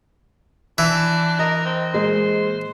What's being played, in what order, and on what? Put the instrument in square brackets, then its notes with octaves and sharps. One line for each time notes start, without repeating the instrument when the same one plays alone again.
[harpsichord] E3 [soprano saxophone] D4
[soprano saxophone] A#4 [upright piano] D#5
[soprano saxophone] C4
[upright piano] A#2 G#3 [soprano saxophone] C5